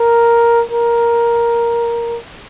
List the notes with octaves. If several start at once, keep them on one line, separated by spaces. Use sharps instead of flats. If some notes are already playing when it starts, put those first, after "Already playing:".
Already playing: A#4
A#4